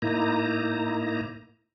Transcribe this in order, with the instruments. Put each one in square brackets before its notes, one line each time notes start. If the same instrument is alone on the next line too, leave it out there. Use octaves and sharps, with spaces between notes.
[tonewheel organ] A2 A#3 D#4 E4 A#5